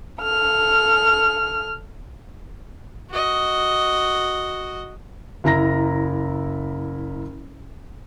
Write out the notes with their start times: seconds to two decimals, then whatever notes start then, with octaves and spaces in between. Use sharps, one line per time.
0.22 A4 F6
3.11 F#4 D#5
5.44 F#1 E4 A#5 A#6